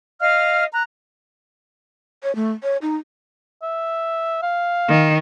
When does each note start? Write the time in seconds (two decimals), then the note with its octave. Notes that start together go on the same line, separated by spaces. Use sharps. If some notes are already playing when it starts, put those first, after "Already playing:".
0.21 D#5 F5 F6
0.72 A#5 F#6
2.23 C#5
2.35 A3
2.63 C#5
2.82 D#4
3.63 E5
4.42 F5
4.88 D#3